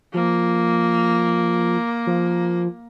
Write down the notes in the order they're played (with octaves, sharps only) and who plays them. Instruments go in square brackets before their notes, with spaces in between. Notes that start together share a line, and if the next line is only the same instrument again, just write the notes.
[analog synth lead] F3 [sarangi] A#3
[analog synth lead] F3